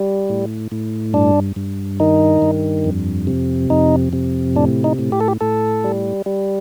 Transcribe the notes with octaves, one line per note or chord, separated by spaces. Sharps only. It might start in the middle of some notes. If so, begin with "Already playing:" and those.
Already playing: G3
A2
A2
G2 D4
G2
D#3 D#4
G2
F2
C3
F2 D#4
C3
A2 D4
D#4
A2
G4
A4
G4
A2 A4
G3
G3